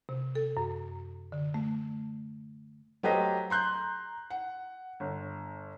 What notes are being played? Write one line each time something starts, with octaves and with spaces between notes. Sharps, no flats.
C3
A4
F#2
D3
A3
F#3 A3 G4 B4 C5 D#5
A#5 C6 F#6 G6
F#5
G1